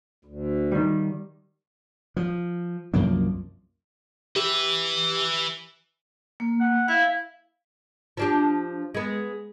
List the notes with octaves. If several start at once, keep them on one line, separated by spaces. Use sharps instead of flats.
D2
D#3 G3
F3
C2 F#2 F3 A#3
G4 B4 E5
A#3
F#5
E4 F5
F3 D4 G4
G#3 B3